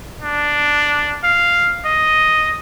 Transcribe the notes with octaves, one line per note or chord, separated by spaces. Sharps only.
D4
F5
D#5